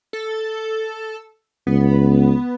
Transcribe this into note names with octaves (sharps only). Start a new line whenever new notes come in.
A4
C#2 B3